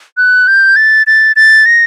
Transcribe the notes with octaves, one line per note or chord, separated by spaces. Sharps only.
F#6
G6
A6
A6
A6
A#6